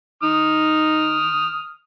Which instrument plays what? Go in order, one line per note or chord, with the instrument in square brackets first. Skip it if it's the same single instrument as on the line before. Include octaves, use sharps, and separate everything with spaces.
[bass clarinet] D#4 [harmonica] D#6 F6